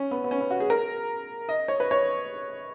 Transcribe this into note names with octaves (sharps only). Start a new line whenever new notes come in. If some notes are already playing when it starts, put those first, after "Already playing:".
Already playing: C#4
B3
B3
C#4
B3
F#4
G#4
A#4
D#5
C#5
B4
C#5